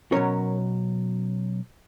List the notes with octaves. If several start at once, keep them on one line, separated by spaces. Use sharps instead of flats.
B2 F#3 A#3 C#4 A#4 C#5